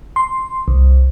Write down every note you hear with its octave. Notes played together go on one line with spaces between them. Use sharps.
C6
C2